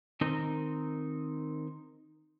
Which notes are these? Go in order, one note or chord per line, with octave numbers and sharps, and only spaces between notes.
D#3 C4 D#4 A#4